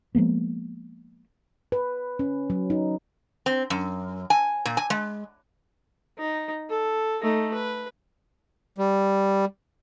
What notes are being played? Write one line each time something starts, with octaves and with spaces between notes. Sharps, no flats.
F3 G#3 A#3 B3
B4
C#4
F#3
D#4
C4
F#2
G#5
A#2
G#5
G#3
D#4
A4
A3 D#4
B4
G3